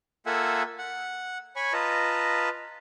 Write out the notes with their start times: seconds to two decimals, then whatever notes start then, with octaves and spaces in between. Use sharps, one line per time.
0.26 A#3 F4 A4 E5 F#5 G#5
0.78 F#5
1.56 C#5 G#5 B5 C#6
1.73 F4 B4 D#5 A5 A#5